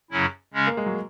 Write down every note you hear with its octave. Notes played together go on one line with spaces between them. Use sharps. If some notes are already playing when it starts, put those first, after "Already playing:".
F#2 C#3 F#3 C#4 E4
C#3 G#3 C#4
A#3
G#3
F#3